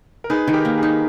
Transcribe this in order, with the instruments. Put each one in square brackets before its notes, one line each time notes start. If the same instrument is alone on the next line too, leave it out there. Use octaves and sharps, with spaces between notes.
[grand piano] A#4
[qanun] D#4 [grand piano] G#4 B4
[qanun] D#3
[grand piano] G4 A#4
[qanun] A#3
[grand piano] G#4
[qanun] D#4